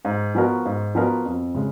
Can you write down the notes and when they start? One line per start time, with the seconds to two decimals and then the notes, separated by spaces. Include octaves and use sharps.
0.05 G#2
0.35 F3 B3 F#4 A#4
0.65 G#2
0.95 F3 B3 F#4 A#4
1.25 F2
1.55 C#3 G#3